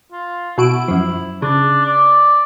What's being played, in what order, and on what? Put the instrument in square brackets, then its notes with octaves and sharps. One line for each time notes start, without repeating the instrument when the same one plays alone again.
[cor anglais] F4
[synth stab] B2 F#4 D7 [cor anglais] E4
[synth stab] F#2 F3
[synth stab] C#3 [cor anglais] D4
[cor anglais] D5